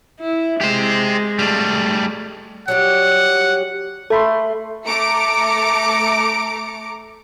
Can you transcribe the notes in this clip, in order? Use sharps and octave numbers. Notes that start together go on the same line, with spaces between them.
E4
G#3 G4 C5
G3 A3
F#3 G3 G4 F#5
A3 A4 B5 C6
A3 A#5 D6 C#7 D7